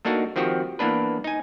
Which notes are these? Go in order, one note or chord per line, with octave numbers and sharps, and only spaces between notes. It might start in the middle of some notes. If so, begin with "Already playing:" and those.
A3 A#3 D4 D#4 F#4
D#3 F3 C4 F#4 G4
E3 A#3 B3 D4 B4
D#4 G#5